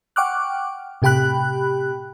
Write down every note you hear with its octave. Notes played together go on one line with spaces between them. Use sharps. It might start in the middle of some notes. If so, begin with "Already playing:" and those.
F#5 G5 C#6 D6 F6 F#6
A2 C3 G4 G5 B5 F#6